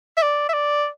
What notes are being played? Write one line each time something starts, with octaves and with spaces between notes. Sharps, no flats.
E5
D5
E5
D5